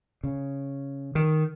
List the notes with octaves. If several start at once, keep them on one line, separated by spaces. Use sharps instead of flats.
C#3
D#3